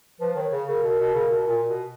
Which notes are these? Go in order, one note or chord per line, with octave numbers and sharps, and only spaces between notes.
F3 B4
D#3 C#5
C#3
C#3 A#4
B2 A#4
B2
C#3
B2
A#2
B2